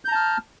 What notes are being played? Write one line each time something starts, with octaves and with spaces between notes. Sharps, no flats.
A5 A#5 F6 G6